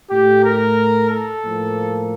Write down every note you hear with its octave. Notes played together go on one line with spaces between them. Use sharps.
A2 A3 G4
A#4
A4
A2 F3 A#3